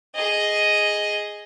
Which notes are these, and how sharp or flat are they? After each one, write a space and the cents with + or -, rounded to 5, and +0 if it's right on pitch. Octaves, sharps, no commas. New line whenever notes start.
G#4 +0 D#5 +0